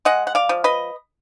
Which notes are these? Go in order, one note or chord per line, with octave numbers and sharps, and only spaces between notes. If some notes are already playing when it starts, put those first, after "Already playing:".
G#3 D#5 F#5
F#5
D5 F5
F3
B4 D#5